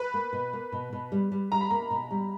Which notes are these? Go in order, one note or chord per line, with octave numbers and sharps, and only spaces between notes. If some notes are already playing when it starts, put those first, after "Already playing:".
Already playing: B4
A#3
B2
A#3
B2
B2
G3
G3
G3 A#5
B5
A#3 A#5
B2
G3